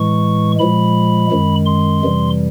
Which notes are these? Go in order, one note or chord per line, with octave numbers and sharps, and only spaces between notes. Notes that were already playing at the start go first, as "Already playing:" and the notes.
Already playing: A2 E3 G#3 C#6
A#2 F3 G#3 B5
F#2 D#3 G#3
C6
F2 C3 E3 G3